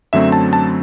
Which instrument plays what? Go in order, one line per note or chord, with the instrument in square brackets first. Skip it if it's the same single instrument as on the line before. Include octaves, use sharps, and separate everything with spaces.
[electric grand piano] F#2 D3 F#3 A3 C4 E5
A5
A5